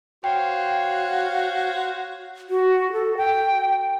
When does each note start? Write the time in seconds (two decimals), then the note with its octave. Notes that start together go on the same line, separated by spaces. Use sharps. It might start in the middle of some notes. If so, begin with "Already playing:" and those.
0.24 F#4 C5 C#5 F5 G5
2.50 F#4
2.93 A4
3.17 G5